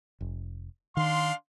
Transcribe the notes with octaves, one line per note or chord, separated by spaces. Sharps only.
F1
D#3 D4 F5 C6